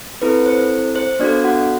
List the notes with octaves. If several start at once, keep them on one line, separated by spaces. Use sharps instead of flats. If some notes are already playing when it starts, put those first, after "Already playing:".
C4 E4 A4 B4
C5
C5
B3 D4 F#4 A4 D5
F#4 F#5